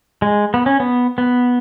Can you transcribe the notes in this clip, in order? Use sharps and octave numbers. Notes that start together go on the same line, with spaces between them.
G#3
B3
C#4
B3
B3